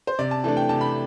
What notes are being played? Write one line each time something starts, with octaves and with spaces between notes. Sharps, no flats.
C5
C3 D5
A5
E3 A3 D4 A5
G5
C3 A5
B5